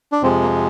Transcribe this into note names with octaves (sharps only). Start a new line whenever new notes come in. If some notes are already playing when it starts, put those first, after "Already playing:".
D4
F2 C3 F3 G#3 C4
A#3